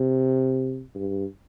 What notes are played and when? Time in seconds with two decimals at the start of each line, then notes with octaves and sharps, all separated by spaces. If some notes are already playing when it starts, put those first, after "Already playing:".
Already playing: C3
0.95 G2